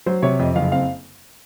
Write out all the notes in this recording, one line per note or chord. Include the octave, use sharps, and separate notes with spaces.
F#3 C5
C3 C#5
F2 D#5
F#1 F5
C4 F5